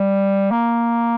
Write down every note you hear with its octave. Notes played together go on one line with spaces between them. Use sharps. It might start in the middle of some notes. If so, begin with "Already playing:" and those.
Already playing: G3
A#3